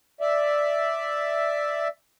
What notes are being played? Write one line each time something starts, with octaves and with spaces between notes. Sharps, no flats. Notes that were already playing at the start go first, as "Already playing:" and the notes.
D5 E5